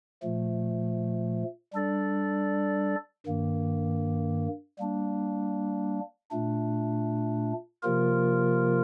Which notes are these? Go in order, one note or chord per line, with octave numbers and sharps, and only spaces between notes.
A#2 F3 A3
G3 D4 A4 D5
G2 D#3 A#3
G3 A#3 D4
A#2 A3 D4
C3 F3 A#3 F4 A#4